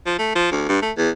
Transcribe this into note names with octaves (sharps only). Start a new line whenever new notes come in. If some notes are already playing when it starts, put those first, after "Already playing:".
F3
A3
F3
D2
G2
A3
E2